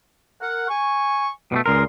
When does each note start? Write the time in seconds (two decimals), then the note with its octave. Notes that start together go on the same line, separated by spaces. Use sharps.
0.41 A#4 F#5
0.69 G#5 C#6
1.52 B2 G3 A3
1.66 C#2 A#2 G#4 A#4 C6